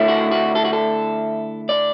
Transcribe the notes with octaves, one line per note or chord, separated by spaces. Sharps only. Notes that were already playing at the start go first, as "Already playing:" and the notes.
Already playing: D3 A3 E4
F#4
F#4
A4
F#4
A4
D5